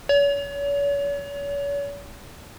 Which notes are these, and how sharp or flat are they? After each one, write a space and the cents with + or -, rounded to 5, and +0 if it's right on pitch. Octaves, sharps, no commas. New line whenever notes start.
C#5 +40